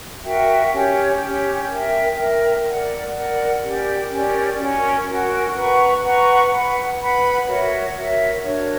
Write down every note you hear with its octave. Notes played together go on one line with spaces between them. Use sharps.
F#4 A#4 E5 G5
C#4 G4 C#5
C#4 G4 C#5
A#4 E5 G5
A#4 E5 G5
A#4 D5 F#5
A#4 D5 F#5
C#4 G4 A#4 D5
C#4 G4 A#4 D5
C#4 F#4 A#4
C#4 F#4 A#4
B4 F#5 A#5 C#6
B4 F#5 A#5 C#6
B4 F#5 B5
B4 F#5 B5
F#4 A#4 C#5 E5
F#4 A#4 C#5 E5
D4 F#4 A#4 C#5